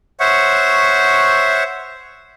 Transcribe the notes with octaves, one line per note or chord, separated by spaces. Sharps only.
C5 C#5 E5 F#5 C#6